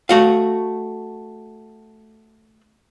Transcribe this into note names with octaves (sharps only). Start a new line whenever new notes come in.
A3 F#4 F5